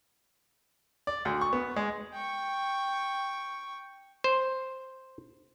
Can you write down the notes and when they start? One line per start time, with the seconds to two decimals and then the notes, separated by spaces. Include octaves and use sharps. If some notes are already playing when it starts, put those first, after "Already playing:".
1.07 D5
1.25 D2
1.41 C#6
1.53 B3
1.76 G#3
2.14 G5 C#6
4.24 C5